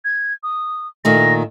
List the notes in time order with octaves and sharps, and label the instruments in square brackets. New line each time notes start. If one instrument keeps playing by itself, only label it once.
[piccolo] G#6
D#6
[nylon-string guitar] A#2 D#3 A3 [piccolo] A#6